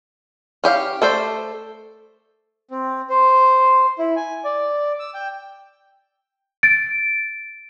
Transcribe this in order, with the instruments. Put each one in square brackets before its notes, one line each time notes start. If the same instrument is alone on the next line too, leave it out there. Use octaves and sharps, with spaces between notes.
[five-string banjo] C#4 G4 E5 F5
A3 A4 C5 D5
[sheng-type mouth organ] C4
C5
E4
G#5
D5
E6
G5
[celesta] A6 D7